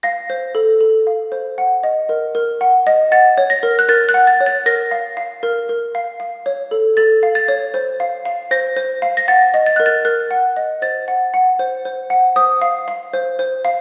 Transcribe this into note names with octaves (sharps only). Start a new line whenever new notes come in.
F5 A#6
C5
A4
A4
F5
C5
F#5
D#5
A#4
A#4
F#5
D#5
F#5 A6
C#5
A#6
A#4
F#6
A#4 A6
F#6
F#5
A6
C#5
A6
A#4 A#6
F5
F5
A#4
A#4
F5
F5
C#5
A4
A4 A6
F5
A6
C#5
C5
F5
F5
C5 A#6
C5
F5
A#6
F#5 A6
D#5
A6
A#4 F#6
A6
A#4 F#6
F#5
D#5
C5 A6
F#5
F#5
C5
C5
F#5
C5 D#6
F5
F5
C5
C5
F5